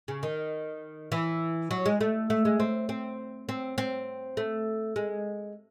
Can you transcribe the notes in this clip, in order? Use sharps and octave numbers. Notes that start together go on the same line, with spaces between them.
C#3
D#3
E3
F#3
G#3
A3
A3
G#3
C4
C4
C4
C4
A3
G#3